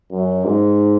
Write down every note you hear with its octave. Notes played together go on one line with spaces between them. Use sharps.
F#2
G#2